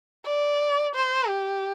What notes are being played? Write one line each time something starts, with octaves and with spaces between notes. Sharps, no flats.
D5
C5
G4